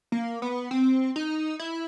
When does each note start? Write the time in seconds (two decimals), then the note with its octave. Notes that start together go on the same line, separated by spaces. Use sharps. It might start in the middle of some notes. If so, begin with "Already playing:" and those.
0.12 A#3
0.42 B3
0.71 C4
1.16 D#4
1.59 E4